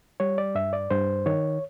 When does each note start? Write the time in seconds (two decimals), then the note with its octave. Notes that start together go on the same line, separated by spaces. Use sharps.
0.20 G3 C#5
0.38 D5
0.55 G2 E5
0.73 D5
0.91 G2 C5
1.26 D#3 C#5